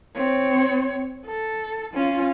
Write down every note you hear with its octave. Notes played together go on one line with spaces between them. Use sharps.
C4 C#5
A4
C#4 F4